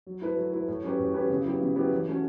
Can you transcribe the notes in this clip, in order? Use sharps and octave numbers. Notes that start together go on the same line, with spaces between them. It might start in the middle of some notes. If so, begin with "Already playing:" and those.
F#3
A3 E4 B4
F#3
A3 E4 B4
A2
F#3 C#4 G4 B4
A2
F#3 C#4 G4 B4
C#3
F#3 B3 E4 G4
C#3
F#3 B3 E4 G4
E3
A3 C#4 F#4